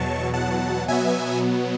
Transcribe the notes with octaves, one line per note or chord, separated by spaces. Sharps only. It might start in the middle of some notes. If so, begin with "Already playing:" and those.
Already playing: E2 B2 F#3 A5 C#6
F#5 A5
B2 F#3 B3 E5 G#5